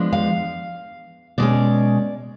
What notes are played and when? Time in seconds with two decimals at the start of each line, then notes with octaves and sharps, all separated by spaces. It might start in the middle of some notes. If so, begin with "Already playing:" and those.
Already playing: F3 G#3 B3 D4
0.12 F5
1.38 B2 G#3 C#4 D5